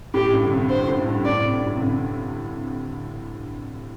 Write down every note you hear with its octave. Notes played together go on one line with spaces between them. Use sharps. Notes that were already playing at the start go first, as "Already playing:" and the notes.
A2 G4
G2
D3
C3
D3 C5
A2
G2
A2 D5
C3
G2
A2
C3
D3